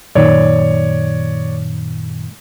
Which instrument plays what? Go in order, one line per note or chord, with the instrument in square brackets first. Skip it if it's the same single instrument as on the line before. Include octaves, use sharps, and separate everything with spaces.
[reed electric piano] F#2 A#2 D#3 [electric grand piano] C#5 D5